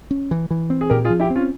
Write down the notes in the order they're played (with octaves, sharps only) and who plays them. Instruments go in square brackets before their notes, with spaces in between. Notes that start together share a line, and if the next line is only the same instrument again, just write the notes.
[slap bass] C#4
E3
E3
C4
[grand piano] G#4
[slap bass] A#2 [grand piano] G4 A#4
[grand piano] F4 G#4
[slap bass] F3
[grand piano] E4 G4
[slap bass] C4
[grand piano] C#4 F4